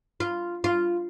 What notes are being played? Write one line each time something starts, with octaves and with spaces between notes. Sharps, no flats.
F4
F4